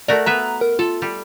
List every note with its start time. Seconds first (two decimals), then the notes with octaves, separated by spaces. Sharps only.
0.08 A3 F#4 A#4 D5
0.26 B3 B4 E5 A#5
0.61 A#4
0.79 F4 A4
1.02 G3